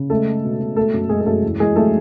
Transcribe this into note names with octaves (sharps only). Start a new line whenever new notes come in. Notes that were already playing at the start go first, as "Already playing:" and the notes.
Already playing: C#3
G#3 A3 A4
G#3
B2
B2
G#3 A3 A4
F#2
F#2 G#3 G#4
G#4
F#2 A3 A4
E2
E2 G#3 G#4
F#3 A3 A4